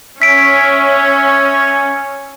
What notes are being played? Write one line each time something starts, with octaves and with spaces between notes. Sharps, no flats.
C#4 C#5 E5 G#5 B6 D7